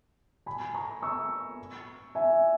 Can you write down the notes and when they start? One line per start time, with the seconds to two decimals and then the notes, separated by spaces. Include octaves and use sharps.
0.46 G#5 B5
0.74 A#5 C#6
1.02 C#6 E6
2.15 E5 G#5